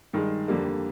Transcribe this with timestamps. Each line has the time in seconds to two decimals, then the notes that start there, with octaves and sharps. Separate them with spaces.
0.13 G2 D#3 G#3
0.48 F2 D3 G3 A#3